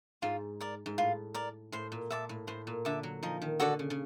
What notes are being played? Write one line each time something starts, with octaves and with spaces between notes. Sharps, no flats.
G#2 F4
A#4 D5
G#2
A2 F4
A#4 D5
A2 C5
A#2
A#2 E5 A5 D6
A2
A2 C5
A#2
D3 E5 A5 D6
F#3
F3 D#4
D#3
D3 F#4 A4 D5
C#3
C#3